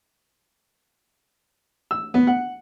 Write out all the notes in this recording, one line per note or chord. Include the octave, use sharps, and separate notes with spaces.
E6
B3
F#5